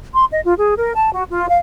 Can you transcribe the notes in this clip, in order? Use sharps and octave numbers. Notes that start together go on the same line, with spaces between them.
C6
D#5
F4
G#4
A#4
A5
F#4
F4
F5